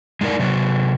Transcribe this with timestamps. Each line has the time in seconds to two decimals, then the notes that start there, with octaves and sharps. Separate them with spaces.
0.21 G#3 D#4 G#4 A#4 D5
0.39 C3 F#3